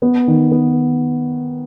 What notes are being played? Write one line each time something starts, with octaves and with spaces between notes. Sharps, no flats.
B3
D#3
B3